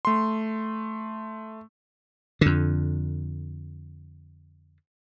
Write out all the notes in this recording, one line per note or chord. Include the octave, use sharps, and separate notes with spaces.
A3 C6
F2 D3